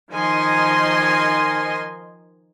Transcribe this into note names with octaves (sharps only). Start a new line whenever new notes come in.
D#3 F3 D#4 D#5 G#5 C6